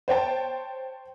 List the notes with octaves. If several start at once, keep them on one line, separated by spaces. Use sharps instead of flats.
C5 C#5 G5 A5